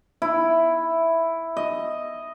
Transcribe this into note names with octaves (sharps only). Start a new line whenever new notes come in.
E4
D#5